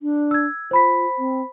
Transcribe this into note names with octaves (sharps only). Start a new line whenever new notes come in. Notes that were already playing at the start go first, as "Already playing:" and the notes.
D4
E6 G#6
F4 C5 B5 B6
C4